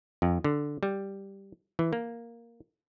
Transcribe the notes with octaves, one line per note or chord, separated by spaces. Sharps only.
F2
D3
G3
E3
A#3